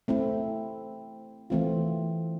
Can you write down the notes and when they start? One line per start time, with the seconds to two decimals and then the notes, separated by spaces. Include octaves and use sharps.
0.08 A3 C4 E4
1.50 E3 A3 C4 F4